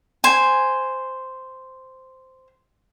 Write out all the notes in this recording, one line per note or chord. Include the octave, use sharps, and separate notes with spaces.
C5 G#5